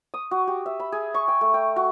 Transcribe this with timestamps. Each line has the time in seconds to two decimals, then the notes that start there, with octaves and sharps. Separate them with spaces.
0.14 D#6
0.31 F#4
0.47 G4
0.66 E5
0.80 B5
0.92 G#4
1.14 C#6
1.28 G5
1.41 A3
1.54 G5
1.76 F#4